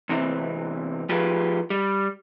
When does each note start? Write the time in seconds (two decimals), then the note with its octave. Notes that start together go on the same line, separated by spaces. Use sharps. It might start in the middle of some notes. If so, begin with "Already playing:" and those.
0.09 E2 C3 E3 C4
1.09 F3 F4 G4 G#4 B4
1.70 G3